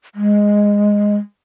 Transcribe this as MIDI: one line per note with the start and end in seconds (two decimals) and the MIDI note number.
0.15 1.16 56